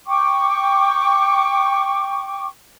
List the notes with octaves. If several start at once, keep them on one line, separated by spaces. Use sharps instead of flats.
G5 C#6 D6